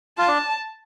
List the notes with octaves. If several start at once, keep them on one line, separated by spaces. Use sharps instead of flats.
F4 A5
D4